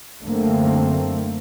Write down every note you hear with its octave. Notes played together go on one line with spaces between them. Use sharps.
F#2 D3 A3 A#3 C4